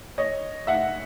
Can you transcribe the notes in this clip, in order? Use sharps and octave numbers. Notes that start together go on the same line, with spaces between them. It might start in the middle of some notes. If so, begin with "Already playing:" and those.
C#5 D#5
E5 F#5